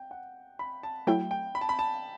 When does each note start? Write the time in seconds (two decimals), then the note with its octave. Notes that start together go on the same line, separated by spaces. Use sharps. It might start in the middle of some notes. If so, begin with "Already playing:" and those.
Already playing: G5
0.11 F#5
0.59 B5
0.83 A5
1.07 F#3 A3 E4 G5
1.31 G5
1.55 B5
1.61 A5
1.69 B5
1.79 A5